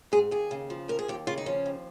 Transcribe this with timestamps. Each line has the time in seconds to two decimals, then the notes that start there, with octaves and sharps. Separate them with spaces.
0.12 G#2 G#4
0.31 D#2 G#4
0.51 C#3
0.70 F3
0.88 D#2 A#4
0.99 G#4
1.08 D#2 G4
1.27 C#3 F4
1.38 D#4
1.46 F3 C#4
1.66 D#2